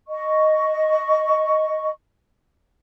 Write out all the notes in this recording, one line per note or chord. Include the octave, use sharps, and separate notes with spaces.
D#5 C#6